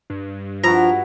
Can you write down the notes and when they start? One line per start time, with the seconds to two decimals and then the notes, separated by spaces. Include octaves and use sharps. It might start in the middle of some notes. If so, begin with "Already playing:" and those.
0.10 G2
0.64 F3 E4 F#4 A#5